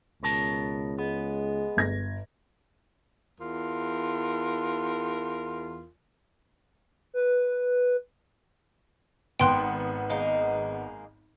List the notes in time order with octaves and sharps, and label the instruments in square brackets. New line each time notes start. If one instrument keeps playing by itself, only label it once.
[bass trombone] C#2 [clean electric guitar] B2 A#4 A5
[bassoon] G#3 [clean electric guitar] B3
[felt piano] G1 G#6 A#6
[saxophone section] E2 F4 A#4
[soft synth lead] B4
[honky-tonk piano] G#1 B3 [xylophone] G5 C6 F#6
[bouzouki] G#3 A#3 D#4